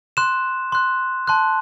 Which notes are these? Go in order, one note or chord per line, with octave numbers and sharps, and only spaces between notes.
C6 F#6 E7
C6 F#6
A5 C6 F#6